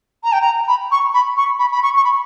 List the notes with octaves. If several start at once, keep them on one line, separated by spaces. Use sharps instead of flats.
A#5
G5
A#5
B5
C#6
B5
C#6
B5
B5
C#6
C#6
B5